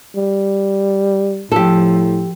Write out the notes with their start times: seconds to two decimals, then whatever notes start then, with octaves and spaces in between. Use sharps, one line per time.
0.16 G3
1.52 A2 F3 G4 A4